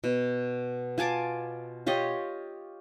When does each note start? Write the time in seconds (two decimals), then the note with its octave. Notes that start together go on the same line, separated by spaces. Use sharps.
0.04 B2
0.98 F4 G#5 A5 D6
1.86 F4 G4 C#5 D#5